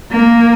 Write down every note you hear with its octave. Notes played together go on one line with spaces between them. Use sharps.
A#3